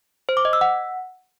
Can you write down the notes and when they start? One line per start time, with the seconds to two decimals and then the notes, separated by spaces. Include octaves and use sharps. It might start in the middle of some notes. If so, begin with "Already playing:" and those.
0.29 C5
0.37 D6
0.45 D#5
0.53 E6
0.61 F#5